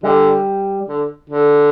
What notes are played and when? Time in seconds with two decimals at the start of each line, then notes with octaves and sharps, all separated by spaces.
0.03 D3 G3
0.88 D3
1.30 D3